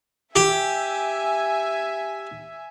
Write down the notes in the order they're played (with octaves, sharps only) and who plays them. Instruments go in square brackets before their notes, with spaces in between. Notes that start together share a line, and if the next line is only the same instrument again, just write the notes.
[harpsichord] G4 [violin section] E5 G#5